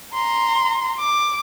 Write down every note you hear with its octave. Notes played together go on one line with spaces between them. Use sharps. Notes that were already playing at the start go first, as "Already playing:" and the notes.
A#5 C6
D6